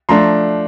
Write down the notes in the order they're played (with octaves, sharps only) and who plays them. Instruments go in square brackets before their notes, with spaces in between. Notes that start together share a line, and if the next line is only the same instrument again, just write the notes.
[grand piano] F3 A3 D4 A#5 C6